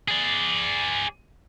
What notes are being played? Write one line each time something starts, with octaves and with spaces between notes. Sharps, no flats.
G#4 D5